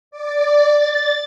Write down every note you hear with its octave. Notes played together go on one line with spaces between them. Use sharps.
D5
A6